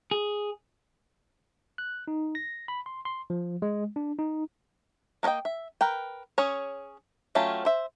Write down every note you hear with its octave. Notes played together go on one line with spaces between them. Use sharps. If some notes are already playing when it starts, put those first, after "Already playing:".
G#4
F#6
D#4
A#6
B5
C6
C6
F3
G#3
D4
D#4
A#3 A#4 C#5 D#5 G5
E5
A#4 B4 G5
C#4 G#4 C#5
F#3 A3 C#4 F4 G4
C5 E5